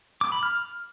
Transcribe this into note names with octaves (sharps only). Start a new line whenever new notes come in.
D6
B5
F6